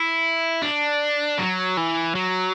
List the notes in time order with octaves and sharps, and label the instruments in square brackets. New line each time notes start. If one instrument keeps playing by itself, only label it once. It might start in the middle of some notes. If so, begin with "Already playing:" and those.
Already playing: [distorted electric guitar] E4
D4
F#3
E3
F#3